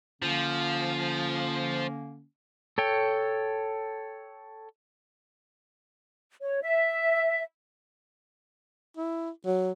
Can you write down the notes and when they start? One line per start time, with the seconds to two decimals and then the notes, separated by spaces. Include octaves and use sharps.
0.22 D3 F3 A#3 C#4
2.78 A4 C#5 G5
6.41 C#5
6.63 E5
8.97 E4
9.46 F#3